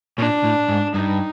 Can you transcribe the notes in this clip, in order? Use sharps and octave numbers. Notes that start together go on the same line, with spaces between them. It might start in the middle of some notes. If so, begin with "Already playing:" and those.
A#2 D4
A2
G#2
G2 D#4